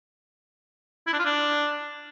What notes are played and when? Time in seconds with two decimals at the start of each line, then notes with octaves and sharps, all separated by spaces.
1.07 E4
1.13 D4
1.19 F4
1.25 D4